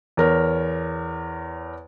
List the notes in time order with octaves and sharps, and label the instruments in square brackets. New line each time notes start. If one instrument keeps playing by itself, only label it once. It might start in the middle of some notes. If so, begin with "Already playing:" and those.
[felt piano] E2 A#4 C#5